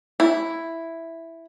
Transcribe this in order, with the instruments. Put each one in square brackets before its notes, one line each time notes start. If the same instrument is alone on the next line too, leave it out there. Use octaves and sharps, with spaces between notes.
[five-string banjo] E4